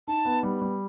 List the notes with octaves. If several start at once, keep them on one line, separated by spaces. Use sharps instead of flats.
D#4 A5
B3
G3
G3